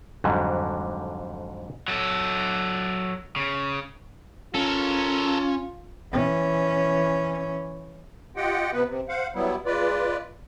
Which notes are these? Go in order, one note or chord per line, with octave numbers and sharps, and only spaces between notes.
F2 G#2 D3 F#3 G3
F#3 A4
C#3
C#4 F4 A4 A#4
E3 C#4
F4 G4 D#5 F#5 G5
C3 B3 B4
C3
C5 F5 F#5
F#3 G3 B3 E4
G#3 F4 B4 D5